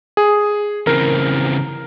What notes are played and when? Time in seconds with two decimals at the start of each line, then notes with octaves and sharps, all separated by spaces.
0.17 G#4
0.87 C#3 E3 C4 A#4